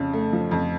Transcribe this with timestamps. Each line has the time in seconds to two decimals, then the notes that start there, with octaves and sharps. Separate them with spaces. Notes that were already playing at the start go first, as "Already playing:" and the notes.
Already playing: F2 C#3 C#5
0.13 A3
0.33 F3
0.51 F2